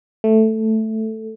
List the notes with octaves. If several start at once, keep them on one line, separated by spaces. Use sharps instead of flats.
A3